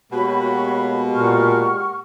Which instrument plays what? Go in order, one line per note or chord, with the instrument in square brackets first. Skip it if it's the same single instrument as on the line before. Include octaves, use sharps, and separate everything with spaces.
[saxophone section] B2 [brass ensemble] G#3 A#3 G4 [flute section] F#4 C#5 B5
[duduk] A#2 [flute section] F#5 C#6 F6